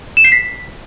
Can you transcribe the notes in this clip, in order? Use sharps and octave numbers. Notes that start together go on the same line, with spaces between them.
E7
C7
B6